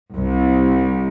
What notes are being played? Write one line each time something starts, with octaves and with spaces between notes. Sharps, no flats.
C2